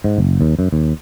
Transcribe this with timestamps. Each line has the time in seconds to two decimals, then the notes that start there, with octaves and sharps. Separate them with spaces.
0.04 G#2
0.18 F#1
0.41 D#2
0.59 F#2
0.72 D#2